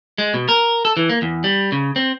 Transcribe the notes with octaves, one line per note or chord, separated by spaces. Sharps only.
G#3
B2
A#4
A4
E3
A#3
E2
G3
C#3
C4